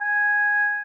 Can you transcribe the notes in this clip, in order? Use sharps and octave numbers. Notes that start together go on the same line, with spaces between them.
G#5